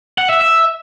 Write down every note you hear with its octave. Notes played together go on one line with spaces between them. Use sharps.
F#5
E5
E5